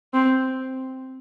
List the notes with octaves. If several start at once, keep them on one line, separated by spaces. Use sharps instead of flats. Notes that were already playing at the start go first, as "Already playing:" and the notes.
C4